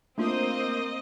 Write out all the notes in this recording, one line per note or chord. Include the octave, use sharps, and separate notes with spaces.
A3 A#3 C4 D4 F4 C5 D#5 D#6